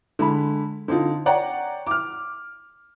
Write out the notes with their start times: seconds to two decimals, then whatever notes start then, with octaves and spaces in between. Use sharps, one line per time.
0.19 D3 G#3 B5
0.88 D3 C4 D#4 F4
1.26 C#5 D5 F#5 G5 A#5
1.87 D6 F6